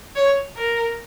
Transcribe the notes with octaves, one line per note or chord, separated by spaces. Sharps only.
C#5
A#4